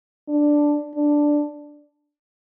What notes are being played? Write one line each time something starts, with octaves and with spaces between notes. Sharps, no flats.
D4
D4